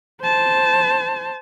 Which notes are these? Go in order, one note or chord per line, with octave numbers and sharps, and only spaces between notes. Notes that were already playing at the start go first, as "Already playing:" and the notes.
C5 A5